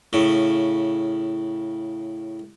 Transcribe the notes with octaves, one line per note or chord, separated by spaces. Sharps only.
A2 C#3